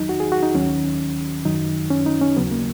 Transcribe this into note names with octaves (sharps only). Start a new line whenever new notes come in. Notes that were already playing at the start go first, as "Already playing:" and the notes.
Already playing: E2 D#3 F#3 D#4
F#4
G#4
F#4
D#4
D#2 D#3 F#3 C#4
F#2 D#3 F#3 D#4
C#4
D#4
C#4
D#2 C#3 F#3 B3
A#3